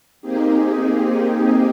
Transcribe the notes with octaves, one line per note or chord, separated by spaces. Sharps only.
A#3 C4 D#4 G4 G#4